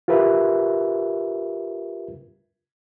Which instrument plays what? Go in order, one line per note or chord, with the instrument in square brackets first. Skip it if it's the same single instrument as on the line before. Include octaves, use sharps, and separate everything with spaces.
[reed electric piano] F4 G4 A#4 B4 E5